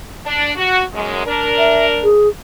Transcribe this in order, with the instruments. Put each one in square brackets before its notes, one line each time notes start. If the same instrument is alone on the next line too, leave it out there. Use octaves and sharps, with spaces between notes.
[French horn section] D4
F#4
F#2 G#3
D4 A#4
[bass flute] E5
G#4